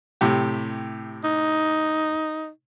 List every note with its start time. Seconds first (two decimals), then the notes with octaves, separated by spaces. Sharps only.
0.21 A2 C3 G4
1.24 D#4